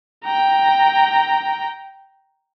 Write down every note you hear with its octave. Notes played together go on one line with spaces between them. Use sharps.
G5 A#5